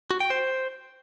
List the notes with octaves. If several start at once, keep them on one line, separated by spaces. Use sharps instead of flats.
F#4
G5
C5